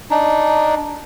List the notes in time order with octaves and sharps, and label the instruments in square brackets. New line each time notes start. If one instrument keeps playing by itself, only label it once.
[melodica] D4 D#4